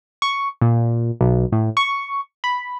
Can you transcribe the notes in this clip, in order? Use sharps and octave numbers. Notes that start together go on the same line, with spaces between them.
C#6
A#2
B1
A2
C#6
B5